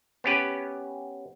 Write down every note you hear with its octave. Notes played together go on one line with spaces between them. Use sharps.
B3 C#4 G4 B4